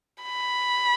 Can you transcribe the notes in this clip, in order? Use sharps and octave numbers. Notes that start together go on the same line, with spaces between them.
B5